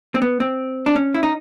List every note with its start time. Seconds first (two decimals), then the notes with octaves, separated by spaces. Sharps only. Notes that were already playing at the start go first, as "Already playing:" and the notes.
0.15 C4
0.22 B3
0.40 C4
0.86 D4
0.96 C#4
1.14 E4
1.23 D#4